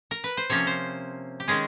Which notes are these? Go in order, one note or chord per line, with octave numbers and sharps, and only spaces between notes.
A#4
B4
C5
C3 F3 A#3 C#4 C#5
C5
G4
D#3 G#3 C#4 G#4